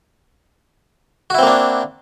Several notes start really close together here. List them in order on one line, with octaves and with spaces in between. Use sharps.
F#4 E4 C4 A#3 D4